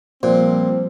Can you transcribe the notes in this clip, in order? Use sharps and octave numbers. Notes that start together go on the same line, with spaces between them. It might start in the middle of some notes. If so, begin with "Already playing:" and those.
A#2 F3 G3 C4 C5